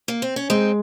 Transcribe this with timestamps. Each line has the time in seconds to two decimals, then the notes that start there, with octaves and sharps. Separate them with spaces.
0.08 A#3
0.22 C4
0.36 C#4
0.50 G#3 C4 D#4